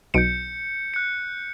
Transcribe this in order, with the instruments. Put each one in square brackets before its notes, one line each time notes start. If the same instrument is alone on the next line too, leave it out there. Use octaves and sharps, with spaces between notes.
[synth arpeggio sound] B1 B2 D7 [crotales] G6 C#7
[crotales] F#6 C#7